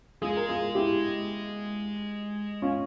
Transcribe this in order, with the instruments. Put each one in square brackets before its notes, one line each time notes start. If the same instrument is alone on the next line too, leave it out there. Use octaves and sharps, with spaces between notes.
[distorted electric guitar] G#3 [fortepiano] F4 G#4
[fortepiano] A#4
F4 G#4
E4 G4
C#4 F4